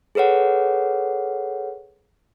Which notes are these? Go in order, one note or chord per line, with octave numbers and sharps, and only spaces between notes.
G#4 A4 B4 C#5 F#5